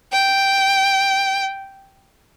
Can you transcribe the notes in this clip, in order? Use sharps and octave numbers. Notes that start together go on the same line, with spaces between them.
G5